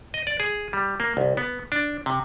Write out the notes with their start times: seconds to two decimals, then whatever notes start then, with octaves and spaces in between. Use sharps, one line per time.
0.14 D#5
0.27 D5
0.40 G#4
0.73 G3
1.00 A#3
1.17 C2
1.37 B3
1.72 D4
2.06 C3